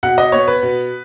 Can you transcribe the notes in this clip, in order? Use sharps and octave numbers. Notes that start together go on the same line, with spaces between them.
B2 F#5
D#5
B3 C#5
B4
B2